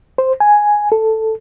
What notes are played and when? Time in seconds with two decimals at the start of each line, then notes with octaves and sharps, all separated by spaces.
0.18 C5
0.40 G#5
0.92 A4